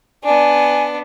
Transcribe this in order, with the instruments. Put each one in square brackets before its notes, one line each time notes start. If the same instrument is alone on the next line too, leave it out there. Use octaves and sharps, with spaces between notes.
[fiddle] B3 D4 [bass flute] D5 [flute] G#5